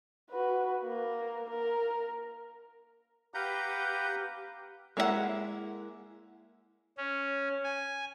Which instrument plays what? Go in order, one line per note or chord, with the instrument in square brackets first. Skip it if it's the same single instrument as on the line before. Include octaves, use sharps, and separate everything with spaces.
[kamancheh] F#4 B4
A#3 A#4
A#4
[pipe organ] G4 B4 G6 [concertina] F5 F#5 A#5
[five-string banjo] G#3 A#3 E4 F#4 F#5
[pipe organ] C#4
G#5